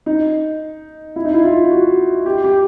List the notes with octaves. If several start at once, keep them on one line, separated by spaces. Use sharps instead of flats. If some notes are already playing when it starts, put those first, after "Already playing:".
D#4
E4
D#4
E4
F4
F#4
G4
G4